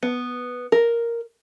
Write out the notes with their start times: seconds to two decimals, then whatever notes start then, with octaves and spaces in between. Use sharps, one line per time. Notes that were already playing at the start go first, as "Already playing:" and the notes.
0.03 B3
0.72 A#4